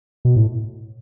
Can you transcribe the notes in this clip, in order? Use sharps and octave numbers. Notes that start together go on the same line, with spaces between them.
B2
A2